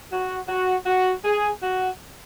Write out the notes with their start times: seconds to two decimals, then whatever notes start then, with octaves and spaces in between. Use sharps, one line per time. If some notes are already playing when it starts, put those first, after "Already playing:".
0.12 F#4
0.49 F#4
0.86 F#4
1.24 G#4
1.62 F#4